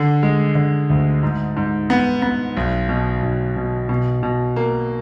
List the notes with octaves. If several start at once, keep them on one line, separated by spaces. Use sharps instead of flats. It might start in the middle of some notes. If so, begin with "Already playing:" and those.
Already playing: D3
G#3
D3
D2
G#2
G#2
B3
B3
B1
B2
B1
B2
B2
B2
A#3